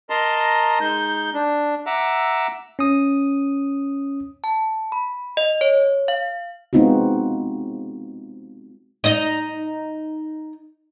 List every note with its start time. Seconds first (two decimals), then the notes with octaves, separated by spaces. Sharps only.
0.10 A#4 D#5 A5 A#5 C6
0.80 G#3 D#4 G6
1.34 D4
1.86 E5 F#5 A#5 D6 E6
2.79 C#4 D#6
4.44 A5
4.92 B5
5.37 D#5
5.61 C#5
6.08 F5
6.73 G#3 B3 C4 D#4 F4 F#4
9.04 D#4 D#5